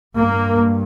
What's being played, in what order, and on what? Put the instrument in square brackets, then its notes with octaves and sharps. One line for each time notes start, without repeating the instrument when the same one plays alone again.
[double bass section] G2 A#3